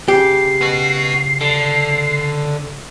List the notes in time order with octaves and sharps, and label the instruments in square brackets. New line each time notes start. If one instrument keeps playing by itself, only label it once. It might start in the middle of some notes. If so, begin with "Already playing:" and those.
[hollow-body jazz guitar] C#3 G4 [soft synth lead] C7
[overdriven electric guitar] B3 F#4
D3